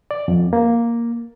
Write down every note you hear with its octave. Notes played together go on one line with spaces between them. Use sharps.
D5
F2
A#3